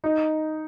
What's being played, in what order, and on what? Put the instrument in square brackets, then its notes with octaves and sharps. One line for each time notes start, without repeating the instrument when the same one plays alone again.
[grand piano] D#4